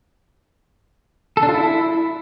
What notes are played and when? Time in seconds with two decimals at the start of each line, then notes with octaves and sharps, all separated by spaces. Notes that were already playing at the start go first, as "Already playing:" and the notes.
1.37 A4
1.43 D4
1.49 F4
1.54 E4